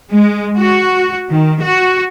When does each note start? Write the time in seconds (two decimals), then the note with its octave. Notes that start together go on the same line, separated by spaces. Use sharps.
0.11 G#3
0.58 F#4
1.32 D#3
1.62 F#4